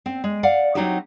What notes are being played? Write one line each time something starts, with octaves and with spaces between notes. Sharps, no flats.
C4
G#3
D5 F5 F#5
F#3 C4 D#4 E4 F#4 G4